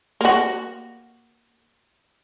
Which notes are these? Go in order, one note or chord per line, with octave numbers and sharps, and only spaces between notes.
A#3 F#4